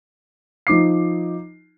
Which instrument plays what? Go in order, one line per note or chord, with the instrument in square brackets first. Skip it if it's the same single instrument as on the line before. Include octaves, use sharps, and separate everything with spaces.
[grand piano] F3 D#4 D6 C7